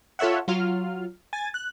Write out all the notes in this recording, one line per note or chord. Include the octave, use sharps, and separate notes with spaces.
F4 A4 C#5 E5 F#5
F#3 F4 F6
G#5 A6
F#6